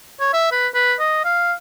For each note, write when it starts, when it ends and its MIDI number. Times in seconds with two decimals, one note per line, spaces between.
0.20 0.33 73
0.33 0.52 76
0.52 0.67 71
0.75 0.94 71
0.99 1.23 75
1.24 1.53 77